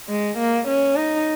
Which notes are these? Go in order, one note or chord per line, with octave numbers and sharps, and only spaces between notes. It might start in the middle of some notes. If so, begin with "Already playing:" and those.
G#3
A#3
C#4
D#4